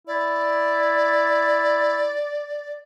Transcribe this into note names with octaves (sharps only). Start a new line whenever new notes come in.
E4 D5